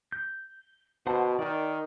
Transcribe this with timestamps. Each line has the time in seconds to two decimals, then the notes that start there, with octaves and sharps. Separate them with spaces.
0.12 G6
1.07 B2 C5 F#5 A5
1.39 D#3 D5